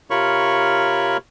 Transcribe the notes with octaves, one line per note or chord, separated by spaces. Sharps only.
C3 F4 A#4 C#5 B5 C#6